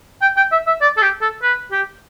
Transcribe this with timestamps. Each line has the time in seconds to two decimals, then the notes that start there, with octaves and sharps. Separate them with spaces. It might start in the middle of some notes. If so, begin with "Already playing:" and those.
0.22 G5
0.36 G5
0.52 E5
0.67 E5
0.81 D5
0.97 A4
1.02 G4
1.21 A4
1.43 B4
1.71 G4